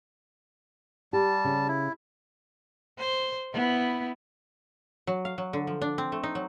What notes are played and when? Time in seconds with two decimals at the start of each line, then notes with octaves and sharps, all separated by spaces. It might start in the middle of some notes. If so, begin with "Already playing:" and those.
1.13 G3 G4 A5
1.45 C#3
1.68 E4
2.98 C5
3.53 B3 E4
5.07 F#3
5.25 F5
5.38 F#3
5.53 D3
5.67 F3
5.82 D4
5.98 C4
6.12 A3
6.23 D#4
6.35 F#3